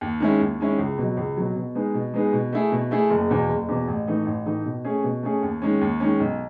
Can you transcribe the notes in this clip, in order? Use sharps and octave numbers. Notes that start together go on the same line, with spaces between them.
D#2
D#3 G#3 C#4 E4
D#2
D#3 G#3 C#4 E4
C#2
B2 F#3
C#2
B2 F#3
B2
G#3 B3 D#4 G#4
B2
G#3 B3 D#4 G#4
B2
A3 E4 G#4
B2
A3 E4 G#4
F#1
E2 B2
F#1
E2 B2
A1
A2 E3 A3 D#4
A1
A2 E3 A3 D#4
B2
A3 C#4 G#4
B2
A3 C#4 G#4
D#2
D#3 G#3 C#4
D#2
D#3 G#3 C#4
B1